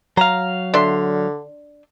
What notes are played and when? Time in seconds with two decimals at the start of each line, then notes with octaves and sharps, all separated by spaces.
0.17 F#3 F5 A#5
0.74 D3 D4 E5 C6